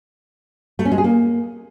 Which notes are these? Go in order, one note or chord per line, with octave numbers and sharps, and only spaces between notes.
A3
C#4
G#3
G#4
A#3